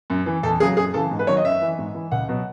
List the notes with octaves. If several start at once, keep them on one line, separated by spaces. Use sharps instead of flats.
F#2
E3
E2 A4
C#3 F#3 G#4
F#2 G#4
C#3 E3 A4
G#2
B4
D#3 F#3 C#5
D#5
F#2 E5
E3
G#2
E3
C#2 F#5
B2 F#3